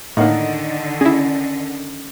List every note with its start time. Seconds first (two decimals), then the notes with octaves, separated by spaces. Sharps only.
0.17 A2 D3 D#3 A#3 D#4 F#5
1.01 C#4 E4 G#4